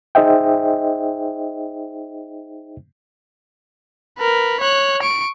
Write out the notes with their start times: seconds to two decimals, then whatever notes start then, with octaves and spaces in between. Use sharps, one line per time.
0.15 D#4 G#4 C5 D#5 E5 G5
4.19 A#4 B4
4.60 C#5 F#6
5.02 C#6 D7